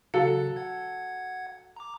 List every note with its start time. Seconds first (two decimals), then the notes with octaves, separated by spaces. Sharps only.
0.14 C#3 F#3 A4 F5
0.56 F#5 G#6
1.76 A#5 D6